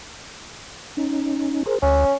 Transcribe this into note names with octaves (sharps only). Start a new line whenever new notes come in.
C#4 D#4
G#4 A#4 C5
D2 C#4